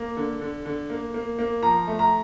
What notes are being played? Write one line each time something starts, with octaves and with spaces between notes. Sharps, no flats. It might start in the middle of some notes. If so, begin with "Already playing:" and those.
Already playing: A#3
D3
D3
D3
A#3
A#3
A#3
F3 A#5
A3
A#5